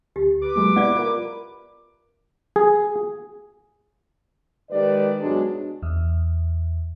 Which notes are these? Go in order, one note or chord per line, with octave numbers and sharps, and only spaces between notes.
D2 G4
B4 D6
F#3 G#3 A#3
B3 E4 D5 E5 F#5
F4 A#4
G#4
D#3 G#3 G4 B4 D5
G#2 B2 F#3 G#3 D4 F#4
E2